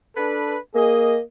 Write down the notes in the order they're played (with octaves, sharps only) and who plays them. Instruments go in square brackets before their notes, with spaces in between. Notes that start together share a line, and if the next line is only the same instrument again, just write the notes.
[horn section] D4 A4 B4
[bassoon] A#3 [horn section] G#4 D#5